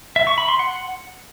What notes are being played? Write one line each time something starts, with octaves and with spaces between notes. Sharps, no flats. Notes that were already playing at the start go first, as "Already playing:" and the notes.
E5
C#6
B5
C6
F#5